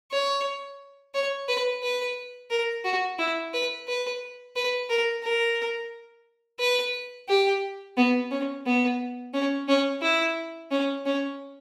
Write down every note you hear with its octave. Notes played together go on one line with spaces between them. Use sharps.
C#5
C#5
B4
B4
A#4
F#4
E4
B4
B4
B4
A#4
A#4
B4
G4
B3
C#4
B3
C#4
C#4
E4
C#4
C#4